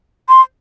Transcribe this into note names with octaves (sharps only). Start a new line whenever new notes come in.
C6